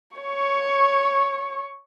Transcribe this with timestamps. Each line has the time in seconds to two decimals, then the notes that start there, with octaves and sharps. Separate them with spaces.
0.17 C#5 C#6